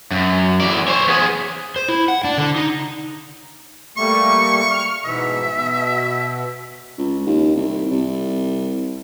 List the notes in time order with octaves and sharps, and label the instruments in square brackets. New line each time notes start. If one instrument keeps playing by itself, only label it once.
[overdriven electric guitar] F#2
E3 D5
C5 C#5
B3 G#4
[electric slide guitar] C5
E4
F#5
D4
D3
D#4
[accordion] G3 A3 A#3 [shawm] C#6
[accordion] F6
[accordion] G#2 B2 E3 [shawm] E5
[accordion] B2
[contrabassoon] C#2
D#2
C2
C2